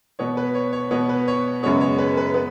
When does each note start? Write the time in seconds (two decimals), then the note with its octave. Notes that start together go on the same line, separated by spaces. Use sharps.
0.19 B2 B3 C#5
0.37 B4
0.55 C#5
0.73 C#5
0.91 B2 B3 C#5
1.09 B4
1.28 C#5
1.63 F#2 C#3 G#3 B3 C#5
1.81 C#5
1.98 B4
2.17 B4
2.34 B3 B4